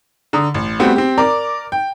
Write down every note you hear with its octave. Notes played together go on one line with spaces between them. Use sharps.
D3 A#5 D#6
A1
G3 A3 B3 C4 F#4
C4 G4
A#4 D5 A#5 D6
G5